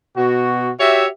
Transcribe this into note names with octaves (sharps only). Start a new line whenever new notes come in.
B2 F#4
F#4 G4 C#5 E5